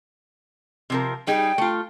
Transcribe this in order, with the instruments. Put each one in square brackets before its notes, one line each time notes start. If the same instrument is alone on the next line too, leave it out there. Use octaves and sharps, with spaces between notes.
[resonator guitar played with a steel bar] C3 F3 A#4
[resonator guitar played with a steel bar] G3 D#4 G#4 [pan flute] G5
[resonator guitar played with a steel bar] A3 F4